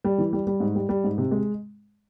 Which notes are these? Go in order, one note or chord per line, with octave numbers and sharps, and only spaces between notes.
G3
E3
G3
G3
G#2
G3
G3
G#2
C3
G#3